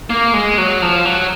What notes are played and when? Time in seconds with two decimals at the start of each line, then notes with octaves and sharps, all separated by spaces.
0.10 A#3
0.33 G#3
0.58 F#3
0.82 F3
1.05 F#3